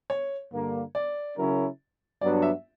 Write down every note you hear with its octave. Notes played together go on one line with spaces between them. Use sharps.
C#5
G2 D3 A#3
D5
C#3 F#3 C#4 E4 A#4
G2 F#3 B3 D4 F#4 D5
E5